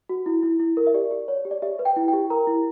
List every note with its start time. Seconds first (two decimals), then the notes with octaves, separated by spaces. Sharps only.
0.09 F#4
0.26 E4
0.43 E4
0.60 E4
0.77 A#4
0.87 E5
0.94 G4 D5
1.11 G4
1.28 C#5
1.45 G4
1.51 D5
1.62 G4 E5
1.79 B4
1.85 G5
1.96 E4
2.08 G5
2.13 G4
2.30 A#4 A#5
2.47 E4